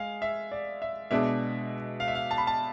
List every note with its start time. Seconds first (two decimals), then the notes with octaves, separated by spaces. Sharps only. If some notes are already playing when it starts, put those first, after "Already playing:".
Already playing: G#3 F5 G#5
0.22 E5
0.52 D5
0.82 E5
1.11 B2 G#3 D4 E5
2.00 F5
2.08 E5
2.15 F5
2.31 A5
2.38 B5
2.47 A5